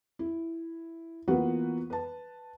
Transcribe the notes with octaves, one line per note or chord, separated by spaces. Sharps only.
E4
E3 A#3 B3 F4 F#4 B4
B4 A5